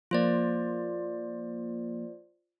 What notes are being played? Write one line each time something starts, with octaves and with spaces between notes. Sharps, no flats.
F3 A#3 F4 C5 D5